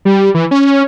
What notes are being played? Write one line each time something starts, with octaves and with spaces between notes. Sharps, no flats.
G3
E3
C#4